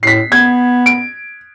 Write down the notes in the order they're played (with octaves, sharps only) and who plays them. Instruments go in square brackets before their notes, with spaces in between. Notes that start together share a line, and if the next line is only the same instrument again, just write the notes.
[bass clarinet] A2 [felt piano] B6 C7
[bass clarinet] B3 [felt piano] G#6
[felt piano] D7